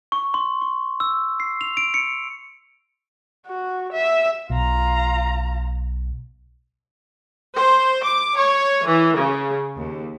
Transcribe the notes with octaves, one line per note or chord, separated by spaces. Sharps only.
C#6
C6
C#6
E6
C7
F7
D7
C#7
F#4
E5
B1 F4 A#5
C5
D6
C#5
E3
C#3
D#2